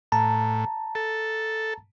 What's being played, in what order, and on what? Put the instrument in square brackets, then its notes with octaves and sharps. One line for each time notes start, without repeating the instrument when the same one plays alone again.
[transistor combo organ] A2 [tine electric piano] A5 A#5
[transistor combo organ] A4